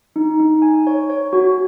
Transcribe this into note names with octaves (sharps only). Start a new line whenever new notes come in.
D#4
D#4
G#5
C#5
C#5
F#4